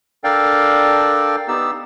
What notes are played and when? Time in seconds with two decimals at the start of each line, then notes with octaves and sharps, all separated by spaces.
0.24 D4 A4 A#4 D5 F5 G5
1.48 B3 D#4 G4 E6